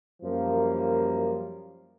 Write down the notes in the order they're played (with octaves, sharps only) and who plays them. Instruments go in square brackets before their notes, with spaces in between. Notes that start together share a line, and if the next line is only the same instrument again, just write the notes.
[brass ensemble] F#2 F3 G3 A#3